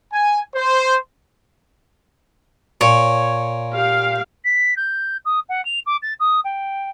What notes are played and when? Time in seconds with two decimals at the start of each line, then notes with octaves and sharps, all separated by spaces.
0.12 G#5
0.55 C5
2.81 A#2 C#5
3.73 G4 F5
4.45 B6
4.77 G6
5.25 D#6
5.49 F#5
5.65 F7
5.86 D6
6.02 A6
6.20 D#6
6.45 G5